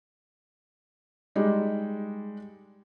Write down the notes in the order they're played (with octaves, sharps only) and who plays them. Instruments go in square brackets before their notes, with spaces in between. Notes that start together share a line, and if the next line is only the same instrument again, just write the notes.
[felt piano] G3 G#3 D#4